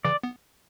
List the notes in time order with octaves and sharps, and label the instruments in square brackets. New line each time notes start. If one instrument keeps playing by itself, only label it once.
[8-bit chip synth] C#3 E3 [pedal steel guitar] D5
[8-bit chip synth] B3